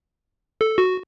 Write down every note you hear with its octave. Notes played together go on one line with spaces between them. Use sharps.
A4
F#4